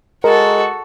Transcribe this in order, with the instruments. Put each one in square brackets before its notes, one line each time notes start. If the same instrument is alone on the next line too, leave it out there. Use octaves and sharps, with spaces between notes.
[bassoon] G#3 [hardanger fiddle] F#4 A4 [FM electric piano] A#4